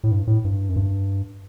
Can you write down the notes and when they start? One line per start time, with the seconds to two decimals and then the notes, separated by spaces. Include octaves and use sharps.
0.04 A2
0.11 G2
0.27 A2
0.45 G2
0.69 F#2
0.76 G2